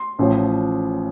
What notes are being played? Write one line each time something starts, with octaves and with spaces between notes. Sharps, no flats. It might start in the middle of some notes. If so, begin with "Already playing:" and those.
Already playing: C6
A1 A2 F3